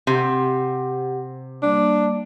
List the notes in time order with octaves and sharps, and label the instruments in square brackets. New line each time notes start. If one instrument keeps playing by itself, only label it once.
[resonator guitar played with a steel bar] C3 [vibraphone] G4 F#5
[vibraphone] G3 A#3 [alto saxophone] D4